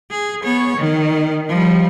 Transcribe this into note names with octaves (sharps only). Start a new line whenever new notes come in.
G#4
B3 C#5
D#3
F3 G3